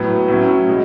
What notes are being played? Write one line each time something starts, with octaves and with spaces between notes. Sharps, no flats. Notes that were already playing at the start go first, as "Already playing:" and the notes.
Already playing: A2 F#3 B3
A2 F#3 C#4 E4
B2 G#3